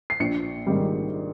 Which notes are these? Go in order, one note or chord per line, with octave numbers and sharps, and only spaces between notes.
C7
A#1 C#7
G#2 D#3 G3